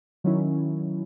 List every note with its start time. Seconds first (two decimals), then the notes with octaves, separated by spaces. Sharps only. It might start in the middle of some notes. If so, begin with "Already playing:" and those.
0.24 D#3 F#3 C#4 E4